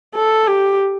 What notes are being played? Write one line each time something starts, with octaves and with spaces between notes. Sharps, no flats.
A4
G4